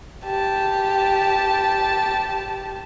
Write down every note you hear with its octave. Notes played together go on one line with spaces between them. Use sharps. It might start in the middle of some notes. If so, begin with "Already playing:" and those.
G4 A5